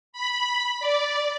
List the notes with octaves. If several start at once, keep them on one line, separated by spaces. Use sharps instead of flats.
B5
D5